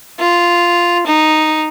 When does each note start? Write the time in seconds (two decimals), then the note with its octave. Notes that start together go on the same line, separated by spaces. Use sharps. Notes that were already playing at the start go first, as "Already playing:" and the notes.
0.20 F4
1.07 D#4